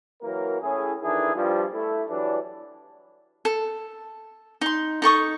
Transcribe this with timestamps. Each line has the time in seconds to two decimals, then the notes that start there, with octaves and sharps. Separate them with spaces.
0.23 E3 F#3 A#3 A#4
0.61 A2 C#4 E4 G#4
1.03 D#3 E3 D4 E4 G#4 A4
1.35 G2 F3 G3
1.73 A3 E4
2.09 E3 F#3 G3 D4
3.45 A4
4.61 D#4 C6
5.02 D#4 A4 C#6 D#6